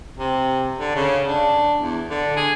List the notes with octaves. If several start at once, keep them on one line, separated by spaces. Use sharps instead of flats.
C3
D3
C#3
D4
E2
D3
G#4